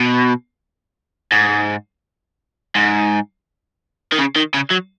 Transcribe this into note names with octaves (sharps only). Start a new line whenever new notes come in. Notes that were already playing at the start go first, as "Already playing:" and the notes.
Already playing: B2
G#2
G#2
D#3
C#3
D#3
C#3
F#3